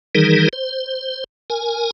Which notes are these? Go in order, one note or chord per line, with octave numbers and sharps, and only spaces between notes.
D#3 E3 G3 D#4 G#4 A#4
C5
A#4 G#5